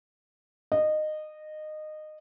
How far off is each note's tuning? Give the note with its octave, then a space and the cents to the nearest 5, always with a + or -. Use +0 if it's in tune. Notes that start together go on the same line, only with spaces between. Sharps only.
D#5 -20